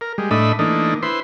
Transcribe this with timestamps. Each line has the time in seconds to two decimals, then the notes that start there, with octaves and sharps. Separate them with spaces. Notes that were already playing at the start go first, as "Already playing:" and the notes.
0.01 A#4
0.18 G3 G#3
0.31 A2 A3 D4 D#5 E5 B5
0.59 E3 A3 A#3 D4 D#4
1.03 E4 B4 C5 C6